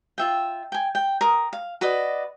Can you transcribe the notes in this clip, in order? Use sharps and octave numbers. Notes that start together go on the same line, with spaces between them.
F4 E5 G5
G5 G#5
G5
A#4 D#6
F5
F#4 B4 D5 D#5